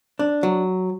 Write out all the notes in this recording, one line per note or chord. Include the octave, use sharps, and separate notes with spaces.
D4
F#3